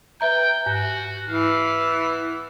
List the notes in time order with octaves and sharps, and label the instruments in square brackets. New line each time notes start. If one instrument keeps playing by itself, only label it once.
[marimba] B4 E5 A#5 [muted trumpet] G5
[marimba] G#2 [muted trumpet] F#4
[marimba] G#2 [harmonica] E3 [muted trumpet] F5
[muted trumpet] B3